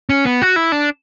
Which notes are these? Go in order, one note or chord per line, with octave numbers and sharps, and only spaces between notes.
C#4
B3
F#4
E4
D4